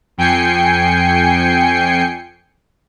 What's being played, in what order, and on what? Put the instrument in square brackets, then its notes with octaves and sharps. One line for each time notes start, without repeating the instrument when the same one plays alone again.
[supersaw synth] F2 G5 G#5 C7 C#7